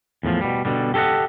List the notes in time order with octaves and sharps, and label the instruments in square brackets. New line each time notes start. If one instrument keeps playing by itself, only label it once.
[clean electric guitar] E2 A2 D#3 F3
B2 G3
B2 D3 G3
G4 A4 C#5 D#5 F#5